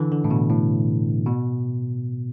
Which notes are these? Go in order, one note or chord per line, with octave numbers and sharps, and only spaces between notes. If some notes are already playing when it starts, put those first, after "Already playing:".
Already playing: D3 E3
D3
A2
B2
A2
B2